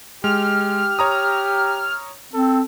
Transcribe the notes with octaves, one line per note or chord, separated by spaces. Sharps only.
G#3 G4 F6
C#5 A#5 D#6
C4 A4